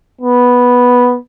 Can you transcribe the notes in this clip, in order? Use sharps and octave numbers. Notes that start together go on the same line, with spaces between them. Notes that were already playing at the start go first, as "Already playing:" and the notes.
B3